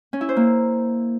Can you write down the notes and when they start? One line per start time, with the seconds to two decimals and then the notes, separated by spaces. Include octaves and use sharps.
0.13 C#4
0.21 E4
0.29 C5
0.36 A#3